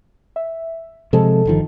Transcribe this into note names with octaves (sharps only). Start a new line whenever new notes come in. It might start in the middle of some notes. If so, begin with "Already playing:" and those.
E5
C3 F3 G#3 A4 D#5 A5
G1 D#3 F3